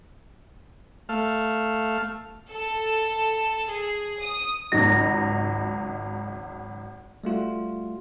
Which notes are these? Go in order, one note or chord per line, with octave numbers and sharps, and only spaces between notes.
A3 F5
A4
G#4
D#6
G#1 C#2 G#2 F#3 D#4 A#6
G3 A3 F4 F#4